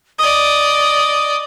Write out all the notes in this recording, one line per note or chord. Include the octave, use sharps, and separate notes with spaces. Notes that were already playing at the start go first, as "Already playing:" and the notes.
D5 D#5 D#6